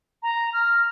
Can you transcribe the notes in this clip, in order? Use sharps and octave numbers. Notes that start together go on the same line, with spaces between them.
A#5
F6